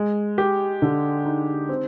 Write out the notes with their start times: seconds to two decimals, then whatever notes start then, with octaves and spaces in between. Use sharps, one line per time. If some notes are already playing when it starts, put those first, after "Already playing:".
Already playing: G#3
0.38 G4
0.82 D3
1.25 D#4
1.69 C4